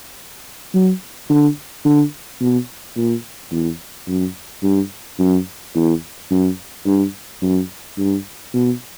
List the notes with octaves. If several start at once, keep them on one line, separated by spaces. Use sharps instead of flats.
F#3
D3
D3
B2
A#2
E2
F#2
G2
F#2
E2
F#2
G2
F#2
G2
B2